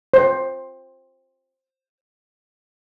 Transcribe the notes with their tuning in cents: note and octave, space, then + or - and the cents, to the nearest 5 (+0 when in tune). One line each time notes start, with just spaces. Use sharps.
C5 +15